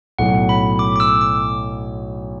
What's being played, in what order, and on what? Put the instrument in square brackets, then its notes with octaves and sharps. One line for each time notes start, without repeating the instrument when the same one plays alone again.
[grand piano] B1 A2 F#3 [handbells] F#5
[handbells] B5
D6
D6
E6
D6